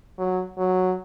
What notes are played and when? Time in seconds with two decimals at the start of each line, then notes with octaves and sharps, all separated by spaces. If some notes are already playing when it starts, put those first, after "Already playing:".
0.19 F#3
0.58 F#3